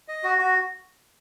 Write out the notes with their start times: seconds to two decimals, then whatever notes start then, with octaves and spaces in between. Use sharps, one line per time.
0.08 D#5
0.23 F#4
0.38 F#4